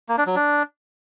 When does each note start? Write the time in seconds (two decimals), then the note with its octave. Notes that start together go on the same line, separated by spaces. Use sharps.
0.09 A#3
0.18 D4
0.27 F#3
0.36 D4